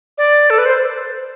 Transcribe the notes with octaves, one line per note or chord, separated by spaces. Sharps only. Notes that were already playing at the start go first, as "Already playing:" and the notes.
D5
A4
B4
C5